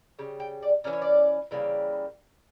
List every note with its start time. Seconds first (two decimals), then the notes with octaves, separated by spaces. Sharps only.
0.19 C#3 G3
0.40 G5
0.62 D5
0.84 E3 G3 C#4 D5
0.93 C#5
1.02 D5
1.51 C#3 E3 G3 A#3